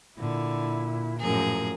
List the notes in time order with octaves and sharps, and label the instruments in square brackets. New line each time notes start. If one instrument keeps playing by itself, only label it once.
[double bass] A#2 [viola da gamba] D3 [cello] E4
[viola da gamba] F#2 A2 F3 [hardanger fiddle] G#4 [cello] A#4